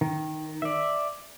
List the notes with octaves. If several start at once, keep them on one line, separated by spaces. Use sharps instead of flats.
D#3
D5 E5